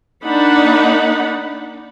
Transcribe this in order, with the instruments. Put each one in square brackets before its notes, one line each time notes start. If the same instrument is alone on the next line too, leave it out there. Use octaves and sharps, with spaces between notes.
[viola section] A#3 D4 D#4 F#5 B5